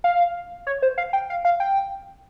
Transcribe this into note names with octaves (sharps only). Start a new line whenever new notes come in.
F5
C#5
C5
F5
G5
F5
F5
G5